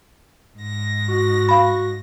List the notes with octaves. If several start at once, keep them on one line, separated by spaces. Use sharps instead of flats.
G#2 A#6
F#4
F5 B5